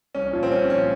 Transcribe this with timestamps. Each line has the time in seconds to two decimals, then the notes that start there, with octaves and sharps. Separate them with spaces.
0.15 C2 C#4
0.33 A#2 F3
0.43 C4
0.52 C2 C#4
0.70 A#2 F3 C#4